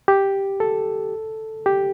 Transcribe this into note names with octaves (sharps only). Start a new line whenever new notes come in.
G4
A4
G4